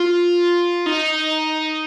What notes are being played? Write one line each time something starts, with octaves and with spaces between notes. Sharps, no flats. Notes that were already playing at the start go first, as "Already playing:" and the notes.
Already playing: F4
D#4